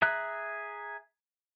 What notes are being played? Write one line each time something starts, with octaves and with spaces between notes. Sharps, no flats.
G#4 E5 A#5 F#6